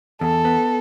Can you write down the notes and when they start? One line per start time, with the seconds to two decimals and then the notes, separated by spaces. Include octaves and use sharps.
0.21 E2 A4
0.45 B3